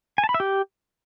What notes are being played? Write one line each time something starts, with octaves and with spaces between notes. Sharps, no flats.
G#5
A5
B5
E5
G4